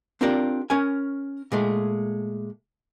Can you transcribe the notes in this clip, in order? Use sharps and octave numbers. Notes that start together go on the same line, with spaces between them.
C4 D4 F4 G4 A#4 D5
C#4 A#4 G#5
A#2 G#3 A3